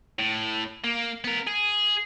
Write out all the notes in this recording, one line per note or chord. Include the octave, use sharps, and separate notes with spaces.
A2
A#3
B3 A#4
G#4